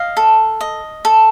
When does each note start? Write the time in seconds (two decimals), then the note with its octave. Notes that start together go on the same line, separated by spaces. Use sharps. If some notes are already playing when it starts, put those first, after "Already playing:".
Already playing: D#5 F5
0.17 A4
0.61 D#5
1.05 A4